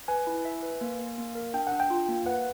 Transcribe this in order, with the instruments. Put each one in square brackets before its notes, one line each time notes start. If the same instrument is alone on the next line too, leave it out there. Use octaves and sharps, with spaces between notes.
[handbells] B4 [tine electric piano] G#5
[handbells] E4
E5
B4
A#3
A#3
A#3
A#4
[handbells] D4 [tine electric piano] G5
[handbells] D4 [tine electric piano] F#5
[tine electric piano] G5
[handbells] F4
A#3
[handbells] B4 [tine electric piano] F#5